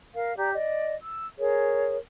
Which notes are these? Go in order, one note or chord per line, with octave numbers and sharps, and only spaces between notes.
A#4 F5
G4 D5 A#5 G6
D5 D#5
E6
G#4 A#4 C#5